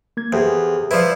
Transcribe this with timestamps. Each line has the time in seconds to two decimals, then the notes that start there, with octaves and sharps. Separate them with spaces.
0.17 A#3 G#6
0.33 E2 G4 A4 C5
0.91 F3 E4 B4 C5 D5